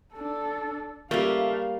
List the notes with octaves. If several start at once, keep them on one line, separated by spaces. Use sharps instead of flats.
D4 A4
C#3 G3 A3 A#3 F5